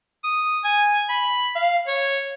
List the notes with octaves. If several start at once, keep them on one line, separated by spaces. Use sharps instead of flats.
D#6
G#5
B5
F5
C#5